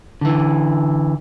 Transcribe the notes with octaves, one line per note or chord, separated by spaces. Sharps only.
D3 E3